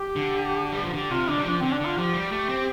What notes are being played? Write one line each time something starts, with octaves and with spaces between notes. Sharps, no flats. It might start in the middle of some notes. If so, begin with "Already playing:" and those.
Already playing: G4
D3
G3
F3
D3 G4
C3 F4
D3 D4
G3
F3 D4
D3 C4
D4
D3 F4
F3 G4
G3
A3
C4